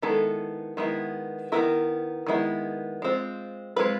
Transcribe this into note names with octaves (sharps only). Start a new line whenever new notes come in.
D#3 G#3 B3 E4 A4
D#3 G#3 B3 E4
D#3 G#3 B3 E4 A#4
D#3 G#3 B3 E4
G#3 C4 F4
G#3 C4 F4 B4